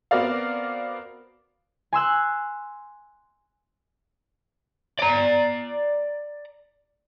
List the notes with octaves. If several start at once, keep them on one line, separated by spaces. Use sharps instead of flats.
B3 C4 F#4 A#4 D5 F5
G#5 C6 E6 F#6
D5 A#5